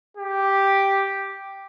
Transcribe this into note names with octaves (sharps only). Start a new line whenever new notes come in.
G4